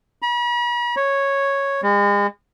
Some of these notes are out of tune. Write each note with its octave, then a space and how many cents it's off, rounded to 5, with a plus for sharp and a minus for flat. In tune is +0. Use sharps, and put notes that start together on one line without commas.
B5 -45
C#5 -5
G#3 -40